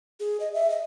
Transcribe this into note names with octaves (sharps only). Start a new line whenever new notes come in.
G#4
D#5
E5
D#5